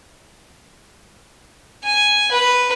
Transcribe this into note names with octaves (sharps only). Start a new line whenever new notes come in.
G#5
B4